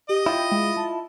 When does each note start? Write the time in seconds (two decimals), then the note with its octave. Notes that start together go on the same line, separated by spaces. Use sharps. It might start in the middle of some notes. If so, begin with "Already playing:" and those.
0.09 G4 D#5
0.26 E4 F4 G5
0.52 G#3
0.77 A5